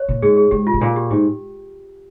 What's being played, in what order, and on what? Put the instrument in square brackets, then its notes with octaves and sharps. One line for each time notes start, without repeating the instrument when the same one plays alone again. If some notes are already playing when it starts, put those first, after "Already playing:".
Already playing: [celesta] C#5
[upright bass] A#2
[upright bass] G#2 [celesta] G#4
[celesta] G#4
[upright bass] G#2 [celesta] G4
[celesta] F4
[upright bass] G#2
[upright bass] A#2 [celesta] F4
[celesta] G4
[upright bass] G#2 [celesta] G4